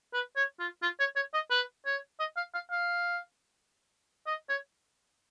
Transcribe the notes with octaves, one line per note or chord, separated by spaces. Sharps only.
B4
C#5
F4
F4
C#5
C#5
D#5
B4
C#5
D#5
F5
F5
F5
D#5
C#5